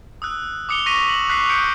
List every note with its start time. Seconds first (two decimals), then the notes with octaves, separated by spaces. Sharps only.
0.22 D#6 E6 F#6
0.69 D6 D#6 C#7 F7 G7
0.86 C#6 A#6 B6 D#7 F7
1.09 F#7
1.29 D6 F#6 B6 C7 F7
1.49 D#6 G6 C#7 D7